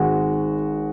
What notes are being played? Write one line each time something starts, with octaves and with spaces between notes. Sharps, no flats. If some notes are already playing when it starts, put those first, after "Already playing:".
Already playing: G#1 G#2 G#3 F#4